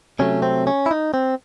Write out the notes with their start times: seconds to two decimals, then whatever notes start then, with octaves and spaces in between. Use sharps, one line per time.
0.19 C3 F#3 A3 C#4
0.42 C4
0.67 C#4
0.86 E4
0.91 D#4
1.14 C4